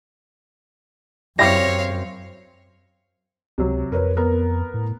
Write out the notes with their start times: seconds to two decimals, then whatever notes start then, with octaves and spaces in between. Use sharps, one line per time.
1.39 F#2 G3 C4 E4 G4 C#5 F5 A#6
3.58 C#2 C3 F#3
3.92 F2 A#4 B4 C#5
4.17 B3 A#4
4.74 A2